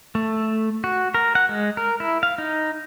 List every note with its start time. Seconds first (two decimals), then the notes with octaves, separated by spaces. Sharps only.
0.15 A3
0.84 F#4
1.14 A#4
1.35 F#5
1.49 G#3
1.77 A#4
2.00 E4
2.23 F5
2.38 D#4